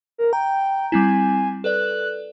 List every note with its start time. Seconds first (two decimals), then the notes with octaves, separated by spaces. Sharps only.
0.18 A#4
0.33 G5 A#5
0.92 G3 C4 E4 G#5
1.64 A4 B4 D5 F#6